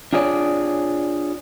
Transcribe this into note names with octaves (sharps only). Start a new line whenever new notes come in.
D4 F4 G#4 C#5 D5